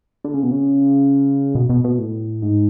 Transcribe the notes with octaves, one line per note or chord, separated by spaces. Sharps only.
D3
C#3
B2
C#3
B2
B2
B2
A2
G#2